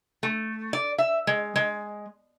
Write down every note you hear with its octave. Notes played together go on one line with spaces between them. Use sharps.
A3
D5
E5
G#3
G#3